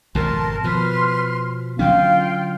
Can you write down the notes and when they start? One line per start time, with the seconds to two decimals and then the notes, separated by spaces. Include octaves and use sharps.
0.15 G#1 F2 B2 A#4 A5 C6
0.64 B2 F3 B4 C6 F6
1.79 D3 F#3 C#4 F4 F5 G5 F6